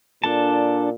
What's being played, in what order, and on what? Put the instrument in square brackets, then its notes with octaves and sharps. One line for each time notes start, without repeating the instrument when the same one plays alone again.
[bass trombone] A#2 [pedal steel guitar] D4 A4 A5